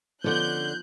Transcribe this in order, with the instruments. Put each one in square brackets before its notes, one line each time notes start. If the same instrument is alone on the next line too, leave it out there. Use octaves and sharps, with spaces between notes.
[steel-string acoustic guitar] D3 C#4 [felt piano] F3 B3 F4 [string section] F#6 G6